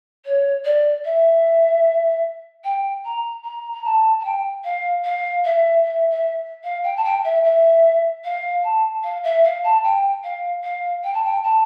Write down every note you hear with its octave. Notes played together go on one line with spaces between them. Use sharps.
C#5
D5
E5
G5
A#5
A#5
A#5
A5
A5
G5
F5
F5
E5
E5
E5
F5
G5
A5
G5
E5
E5
F5
A5
F5
E5
F5
A5
G5
F5
F5
G5
A5
G5
A5